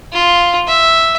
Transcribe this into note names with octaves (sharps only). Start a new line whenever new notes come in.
F4
E5